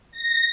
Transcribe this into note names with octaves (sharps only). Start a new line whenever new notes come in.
A#6